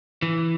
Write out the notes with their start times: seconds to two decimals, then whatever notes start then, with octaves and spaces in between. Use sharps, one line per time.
0.22 E3